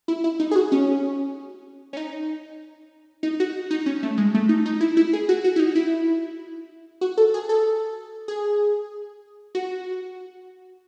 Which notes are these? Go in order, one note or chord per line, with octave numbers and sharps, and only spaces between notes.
E4
E4
D#4
G#4
F#4
C#4
C#4
D#4
D#4
F#4
D#4
C#4
A3
G#3
A3
D#4
D#4
E4
E4
G#4
F#4
F#4
E4
D#4
E4
F#4
A4
G#4
A4
G#4
F#4